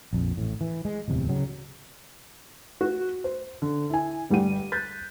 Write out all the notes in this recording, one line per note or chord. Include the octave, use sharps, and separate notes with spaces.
A#1 F2
A1 A2
E3
G#3
D1 E2 C3
C#3 F#3
F#4
C5
D3
E4 G#5
G1 G3 F#5 D#7
F#6 G6 A6 B6